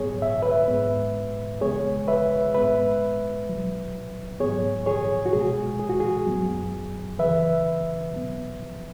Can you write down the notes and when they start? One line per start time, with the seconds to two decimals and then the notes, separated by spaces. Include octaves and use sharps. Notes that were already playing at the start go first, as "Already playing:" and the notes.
Already playing: G#2 F#3 B3 G#4 C#5
0.22 E5
0.42 B4 E5
0.68 G#2 G#3 B3
1.61 F#2 C#3 G#3 B3 G#4 C#5
2.08 B4 E5
2.54 G#2 G#3 B3 B4 E5
3.47 C#2 B2 F#3
4.40 G#2 F#3 B3 G#4 C#5
4.86 G#4 C#5
5.26 F#4
5.33 C#2 B2 G#3 G#4
5.79 G#4
5.89 F#4
6.00 G#4
6.26 F#2 F#3 B3
7.19 C#2 C#3 E3 B4 E5
8.12 B2 F#3 B3